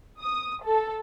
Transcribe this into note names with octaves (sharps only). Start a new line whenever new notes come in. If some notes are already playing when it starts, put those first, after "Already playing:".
D#6
A4